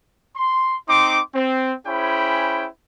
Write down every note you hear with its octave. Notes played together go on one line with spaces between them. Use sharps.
C6
C4 D#4 C6 D6
C4
C#4 E4 G#4 C5 G5 B5